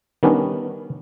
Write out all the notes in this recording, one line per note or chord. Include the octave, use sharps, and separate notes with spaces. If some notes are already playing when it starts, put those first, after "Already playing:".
D#3 G3 B3 C#4 D4